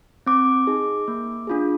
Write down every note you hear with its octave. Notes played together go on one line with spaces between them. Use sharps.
C4 D6
D#4 G#4
A#3
D4 F4 G#4